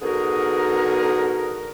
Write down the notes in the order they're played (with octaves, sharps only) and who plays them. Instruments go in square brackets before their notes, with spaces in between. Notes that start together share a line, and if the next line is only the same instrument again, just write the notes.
[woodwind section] D3 B3 D#4 F#4 G#4 A#4